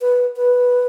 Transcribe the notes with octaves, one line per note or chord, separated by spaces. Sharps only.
B4
B4